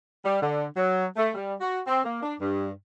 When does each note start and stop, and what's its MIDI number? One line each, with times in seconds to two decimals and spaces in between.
0.24 0.39 55
0.41 0.65 50
0.76 1.06 54
1.16 1.30 57
1.34 1.54 55
1.59 1.78 66
1.86 2.00 60
2.04 2.21 58
2.23 2.34 62
2.40 2.68 43